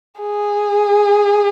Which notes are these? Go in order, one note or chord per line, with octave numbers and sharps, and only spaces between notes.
G#4